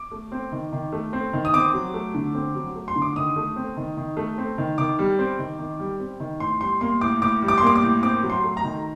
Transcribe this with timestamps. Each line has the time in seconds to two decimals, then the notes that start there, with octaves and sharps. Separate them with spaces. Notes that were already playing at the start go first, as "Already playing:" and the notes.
Already playing: D6
0.11 A3
0.32 C4
0.52 D#3
0.72 D#3
0.93 A3
1.13 C4
1.33 D#3
1.45 D#6
1.54 C4 D6
1.74 F#3
1.94 A3
2.14 D3
2.35 C4
2.55 F#3
2.75 A3
2.88 C6
2.95 D3
3.02 D6
3.16 D#3 D#6
3.36 A3
3.56 C4
3.77 D#3
3.97 D#3
4.17 A3
4.38 C4
4.58 D#3
4.78 D#3 D6
4.99 G3
5.19 C4
5.39 D#3
5.59 D#3
5.79 G3
6.00 C4
6.20 D#3
6.40 A2 C6
6.61 G3 C6
6.81 A#3 C6
7.01 A2 D6
7.22 A2 D6
7.42 G3
7.48 D6
7.58 C6
7.62 A#3 D6
7.75 D6
7.83 A2
8.03 C4 D6
8.23 F#3
8.30 C6
8.44 A3
8.57 A#5
8.64 D#3